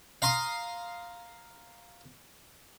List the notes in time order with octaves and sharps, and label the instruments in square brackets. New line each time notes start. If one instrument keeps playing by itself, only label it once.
[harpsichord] F5 A#5 C6 D#6